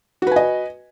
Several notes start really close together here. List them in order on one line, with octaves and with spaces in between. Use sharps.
F#4 B4 G#5 D#5